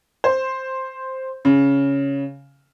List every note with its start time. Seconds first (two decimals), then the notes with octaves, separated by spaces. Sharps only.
0.24 C5
1.45 C#3